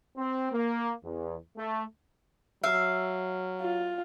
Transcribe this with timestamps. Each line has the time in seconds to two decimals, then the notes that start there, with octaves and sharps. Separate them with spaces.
0.17 C4
0.52 A#3
1.03 E2
1.56 A3
2.64 F#3 E5 F5
3.61 F4